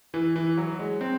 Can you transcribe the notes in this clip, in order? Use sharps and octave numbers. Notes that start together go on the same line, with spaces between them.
E3
E3
F#3
G#3
C4